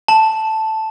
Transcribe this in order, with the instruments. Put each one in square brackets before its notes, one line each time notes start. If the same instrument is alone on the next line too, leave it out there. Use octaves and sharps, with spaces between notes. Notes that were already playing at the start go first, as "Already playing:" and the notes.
[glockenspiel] A5